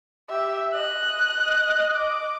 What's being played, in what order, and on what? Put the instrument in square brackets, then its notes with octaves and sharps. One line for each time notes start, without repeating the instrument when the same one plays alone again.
[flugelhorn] G4 [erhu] E5
[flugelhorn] D#5 [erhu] F#6
[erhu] D6